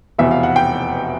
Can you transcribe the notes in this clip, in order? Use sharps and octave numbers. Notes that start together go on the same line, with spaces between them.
F1 E2 B2 E5
F5
F#5
G5